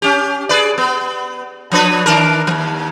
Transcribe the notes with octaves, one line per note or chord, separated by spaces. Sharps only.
C#4 G4
G#4 B4 D5
B3
F3 D4 B4
D#3 D4 A#4
D#2 F3